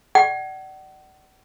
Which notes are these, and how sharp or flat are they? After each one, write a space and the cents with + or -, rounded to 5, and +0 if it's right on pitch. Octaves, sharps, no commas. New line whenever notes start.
D5 +35 F#5 +40